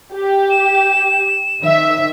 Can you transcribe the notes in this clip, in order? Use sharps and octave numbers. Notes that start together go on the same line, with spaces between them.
G4
E7
D#3 E5